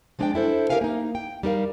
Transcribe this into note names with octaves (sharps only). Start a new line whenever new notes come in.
F3 G#3 D4 C#5 D5 G5
D4 E4 A4 C5
G4 A#4 B4 E5 F5 G#5
A#3 D#4
G5
G3 D#4 A#4 F5